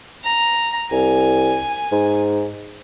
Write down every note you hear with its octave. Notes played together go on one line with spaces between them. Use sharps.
A#5
C2 G#5
G#2